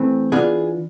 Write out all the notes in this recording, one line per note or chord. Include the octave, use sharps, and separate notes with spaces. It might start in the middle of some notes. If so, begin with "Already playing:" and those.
Already playing: E3 A3 C4
E3 B3 D4 F4 G#4